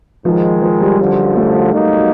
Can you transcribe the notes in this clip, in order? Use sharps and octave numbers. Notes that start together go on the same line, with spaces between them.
G#2 D#3 F3 G#3
F3
G3
F#2 D3 F3
A3
B2 F#3 A#3 D#4